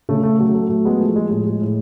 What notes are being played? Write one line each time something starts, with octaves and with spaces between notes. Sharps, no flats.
C#3 A3
A3
F#3 A3
A3
F#3 A3
G#3 B3
F3 A3
G#3
A2 G#3
G#3
A2